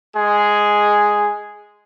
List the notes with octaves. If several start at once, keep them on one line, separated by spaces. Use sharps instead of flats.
G#3 G#4